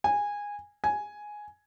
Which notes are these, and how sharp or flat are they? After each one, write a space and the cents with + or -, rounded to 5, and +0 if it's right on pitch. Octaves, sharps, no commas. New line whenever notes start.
G#5 -15
G#5 +5